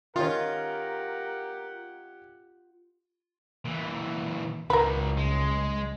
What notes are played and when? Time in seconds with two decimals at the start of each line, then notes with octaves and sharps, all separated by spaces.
0.16 D#3 C#4 F4 G4 A#4 F#5
3.65 A#2 E3
4.70 C#2 G#2 D#3 A#4 B4
5.17 G#3